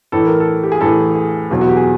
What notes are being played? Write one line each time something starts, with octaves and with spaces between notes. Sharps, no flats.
A2 E3 A4
A#4
A4
G4
G#4
A2 E3 A4
G#4
E2 B2 F#3
F#4
G4
G#4